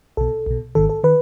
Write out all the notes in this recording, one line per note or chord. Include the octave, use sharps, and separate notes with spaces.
B1 B2 A4
B1 B2
G#1 G#2 D#3 A4
A4
D#3 B4